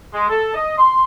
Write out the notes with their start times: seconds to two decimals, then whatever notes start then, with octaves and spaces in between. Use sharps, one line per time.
0.14 G#3
0.29 A4
0.54 D#5
0.78 C6